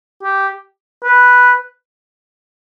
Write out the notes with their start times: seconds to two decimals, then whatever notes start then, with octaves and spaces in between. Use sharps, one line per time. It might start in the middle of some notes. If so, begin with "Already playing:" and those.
0.23 G4
1.04 B4